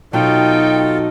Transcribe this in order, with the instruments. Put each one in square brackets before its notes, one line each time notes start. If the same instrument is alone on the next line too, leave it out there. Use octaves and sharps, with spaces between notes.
[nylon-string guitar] B2 F#3 [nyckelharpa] D#4 [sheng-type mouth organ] F4 A4 [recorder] G5